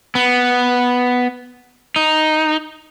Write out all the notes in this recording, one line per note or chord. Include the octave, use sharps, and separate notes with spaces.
B3
D#4